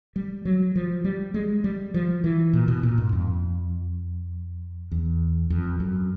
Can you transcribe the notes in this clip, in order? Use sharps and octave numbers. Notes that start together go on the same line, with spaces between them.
G3
F#3
F3
G3
G#3
G3
F3
E3
A#2
B2
A#2
G#2
F2
E2
F2
F#2